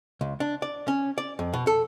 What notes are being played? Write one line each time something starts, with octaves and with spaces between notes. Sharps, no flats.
C#2
D4
D5
C#4
D5
F2
B2
A4